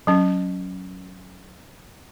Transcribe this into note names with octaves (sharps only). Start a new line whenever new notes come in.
F#3 C#4